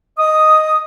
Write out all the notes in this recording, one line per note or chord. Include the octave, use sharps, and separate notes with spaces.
D#5 D#6